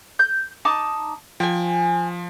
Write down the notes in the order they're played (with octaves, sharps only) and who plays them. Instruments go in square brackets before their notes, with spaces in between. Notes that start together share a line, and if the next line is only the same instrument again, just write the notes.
[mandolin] G6
D#4 A5 D6
[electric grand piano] F3 [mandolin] G5 G#5